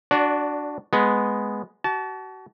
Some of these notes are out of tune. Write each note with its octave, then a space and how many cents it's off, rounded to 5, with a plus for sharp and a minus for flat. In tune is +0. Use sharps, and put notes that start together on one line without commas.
D4 +0 F#4 +0 D5 -25
G#3 +0 B3 +0
F#4 +35 A5 -20